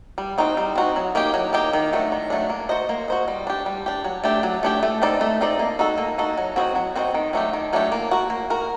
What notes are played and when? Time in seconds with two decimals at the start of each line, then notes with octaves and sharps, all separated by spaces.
0.18 G3
0.38 C4 D#4 F#4
0.57 G3
0.75 C4 D#4 F#4
0.96 F#3
1.15 A#3 D#4 G4
1.34 F#3
1.53 A#3 D#4 G4
1.73 D#3
1.93 F#3 A3 D4
2.12 D#3
2.30 F#3 A3 D4
2.50 A#3
2.69 F#4 C5 D#5
2.89 A#3
3.08 F#4 C5 D#5
3.28 G3
3.47 D4 G4
3.66 G3
3.86 D4 G4
4.04 F#3
4.24 A3 D4 G4
4.43 F#3
4.63 A3 D4 G4
4.83 A3
5.02 C4 D#4 A4 D5
5.21 A3
5.41 C4 D#4 A4 D5
5.59 A#3
5.79 D#4 F#4 A4
5.98 A#3
6.18 D#4 F#4 A4
6.37 F#3
6.56 C4 F#4 C5 D#5
6.75 F#3
6.96 C4 F#4 C5 D#5
7.14 D#3
7.33 F#3 A3 D4 G4
7.53 D#3
7.73 F#3 A3 D4 G4
7.92 A#3
8.11 F#4 A#4
8.30 A#3
8.50 F#4 A#4